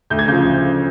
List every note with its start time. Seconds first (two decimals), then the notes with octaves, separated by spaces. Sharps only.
0.10 D2 G6
0.19 G#6
0.28 C#3 F3 G6